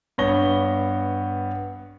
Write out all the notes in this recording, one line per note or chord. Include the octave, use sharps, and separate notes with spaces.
G2 B3 C#5 A#6 G7